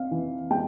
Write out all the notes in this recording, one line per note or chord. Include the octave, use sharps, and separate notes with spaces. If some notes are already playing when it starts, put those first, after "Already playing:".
Already playing: C4 F5
E3
G#3 G5